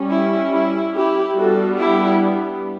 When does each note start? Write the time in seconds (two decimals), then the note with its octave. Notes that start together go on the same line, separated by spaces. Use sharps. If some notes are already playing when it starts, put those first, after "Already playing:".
Already playing: G3 C#4
0.09 E4
0.51 E4
0.93 E4 G4
1.36 G3 B3 D4 F#4 A4
1.78 E4 G4